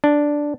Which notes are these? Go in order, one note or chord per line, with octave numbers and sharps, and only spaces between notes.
D4